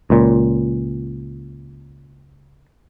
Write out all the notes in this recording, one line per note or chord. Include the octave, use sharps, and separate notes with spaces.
C#2 A#2